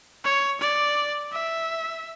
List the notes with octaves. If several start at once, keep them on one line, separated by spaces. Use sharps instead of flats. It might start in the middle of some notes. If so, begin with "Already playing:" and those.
C#5
D5
E5